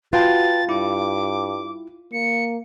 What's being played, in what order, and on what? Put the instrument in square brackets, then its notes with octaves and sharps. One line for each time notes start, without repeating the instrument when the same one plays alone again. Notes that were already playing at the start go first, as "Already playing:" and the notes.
[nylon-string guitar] F4 [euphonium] F#4 [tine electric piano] B4 G5 A5 [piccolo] A6
[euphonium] G2 [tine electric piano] E4 [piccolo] D6
[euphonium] A#3 [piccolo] C#7